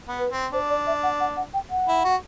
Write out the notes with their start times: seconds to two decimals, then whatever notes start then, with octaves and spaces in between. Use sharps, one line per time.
0.08 B3
0.19 B4
0.31 C4
0.53 D4 C5
0.70 D5
0.87 E5
1.03 F#5
1.20 F#5
1.37 F#5
1.54 G5
1.71 F#5
1.88 E4
2.05 F#4